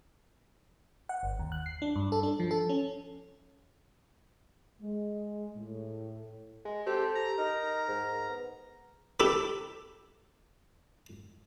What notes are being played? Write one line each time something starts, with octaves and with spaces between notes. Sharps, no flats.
F#5
G1
D#2
F#6
C7
D4
G2
A4
D4
F3
A4
C#4
G#3
A2
G#3
C4 G4 A4
A#5
D#4 A#4
G#2
B3
G4 A4 B4